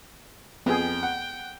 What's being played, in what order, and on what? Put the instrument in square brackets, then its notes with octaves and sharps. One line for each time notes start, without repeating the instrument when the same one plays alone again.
[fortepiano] F2 [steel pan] B3 G#4 [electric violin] G5
[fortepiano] F#5